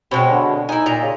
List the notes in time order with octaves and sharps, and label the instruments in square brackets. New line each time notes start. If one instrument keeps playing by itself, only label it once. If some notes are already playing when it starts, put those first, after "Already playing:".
[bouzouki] B2 G#3 C#5 [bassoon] C4
[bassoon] D3
[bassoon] D#4 [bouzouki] E4 G#5
[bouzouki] A#2 D#5 A#5
[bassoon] C#3